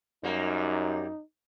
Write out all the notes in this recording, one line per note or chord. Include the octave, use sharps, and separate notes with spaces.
F#2 G3 A#3 D#4